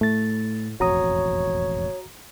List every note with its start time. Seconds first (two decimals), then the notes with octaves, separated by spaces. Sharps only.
0.01 A2 A3 A6
0.80 E1 A1 F2 F#4 C#5 A#5 D#6